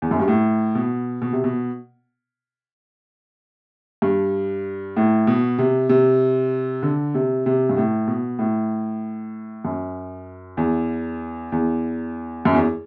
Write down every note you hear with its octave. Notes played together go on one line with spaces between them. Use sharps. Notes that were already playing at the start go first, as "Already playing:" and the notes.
E2
F#2
G2
A2
B2
B2
C3
B2
G2
A2
B2
C3
C3
D3
C3
C3
G2
A2
B2
A2
F#2
E2
E2
F#2
E2